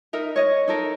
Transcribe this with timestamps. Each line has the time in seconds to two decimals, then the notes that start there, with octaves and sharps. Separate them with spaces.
0.13 D#4 A#4 E5
0.36 C#5 D#5
0.68 D#4 A4 A#4